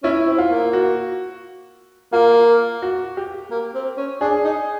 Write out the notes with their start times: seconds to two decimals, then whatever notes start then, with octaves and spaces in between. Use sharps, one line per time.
0.03 C#4 E4
0.26 C4
0.38 F4
0.50 A#3
0.73 F#4
2.13 A#3 F4
2.82 F#4
3.17 G4
3.51 A#3
3.75 C4
3.97 C#4
4.21 D4 G#4
4.44 D#4